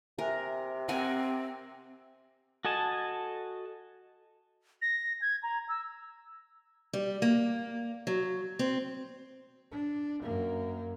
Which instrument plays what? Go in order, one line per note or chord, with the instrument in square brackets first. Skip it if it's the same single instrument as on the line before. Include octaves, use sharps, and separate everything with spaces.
[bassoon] C3 [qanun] A#4 [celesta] E5 G#5 F#6
[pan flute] C4 [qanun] A#4 F#5 G#5 [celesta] C6
[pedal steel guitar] F#4 A4 D#5 G#5 A5
[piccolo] A#6
G#6
A#5
E6
[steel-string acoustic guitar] G3
A#3
F#3
C4
[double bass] D4
F#2 A#3